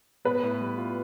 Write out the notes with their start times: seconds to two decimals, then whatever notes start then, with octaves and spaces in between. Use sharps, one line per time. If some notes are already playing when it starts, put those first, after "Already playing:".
0.25 B3 B4
0.43 A2
0.61 G3
0.78 F4